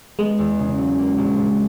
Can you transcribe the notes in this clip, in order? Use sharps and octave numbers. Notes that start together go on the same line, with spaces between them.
G#3 B3
E2
C#3
F#3
A#3
A#1
A#2